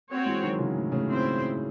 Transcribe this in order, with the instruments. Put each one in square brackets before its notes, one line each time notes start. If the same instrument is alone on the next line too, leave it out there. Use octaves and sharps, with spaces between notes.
[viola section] C4 F#4 C#5
[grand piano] E3 G#3
D#3 F#3
C#3 E3
A2
A2 C#3
[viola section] C4 E4 C5